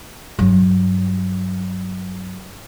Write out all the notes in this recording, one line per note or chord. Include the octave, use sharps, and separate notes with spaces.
G2 F#3